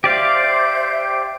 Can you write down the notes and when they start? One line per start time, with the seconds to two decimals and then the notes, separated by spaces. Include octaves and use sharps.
0.04 G4 C5 D5 E5 F5 G6